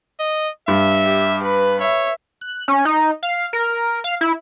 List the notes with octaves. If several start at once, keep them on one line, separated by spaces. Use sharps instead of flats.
D#5
G2 E5
G4
B4 B5
C#5 E5
F#6
C#4
D#4
F5
A#4
F5
E4